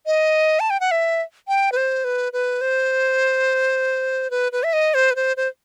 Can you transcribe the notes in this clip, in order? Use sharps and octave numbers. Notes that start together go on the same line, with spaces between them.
D#5
A5
G5
F#5
E5
G5
B4
C5
B4
B4
C5
B4
B4
E5
D#5
C5
B4
C5
C5